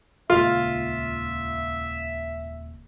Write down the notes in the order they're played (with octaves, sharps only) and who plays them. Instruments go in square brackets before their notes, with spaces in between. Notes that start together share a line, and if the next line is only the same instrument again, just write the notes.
[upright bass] D#1 C#2 [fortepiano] F4 [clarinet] E5